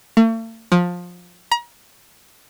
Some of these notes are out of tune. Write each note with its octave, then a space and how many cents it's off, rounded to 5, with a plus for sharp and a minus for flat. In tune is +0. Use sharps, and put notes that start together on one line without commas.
A3 +45
F3 +20
A#5 +35